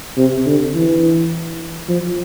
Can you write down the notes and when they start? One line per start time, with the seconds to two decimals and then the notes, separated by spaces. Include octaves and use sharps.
0.17 C3
0.46 D3
0.75 E3
1.88 F3